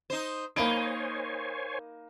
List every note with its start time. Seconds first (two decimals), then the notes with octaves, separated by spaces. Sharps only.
0.10 D#4 C5
0.56 A#3 D#4 C5 C#5 G#5 B5 D7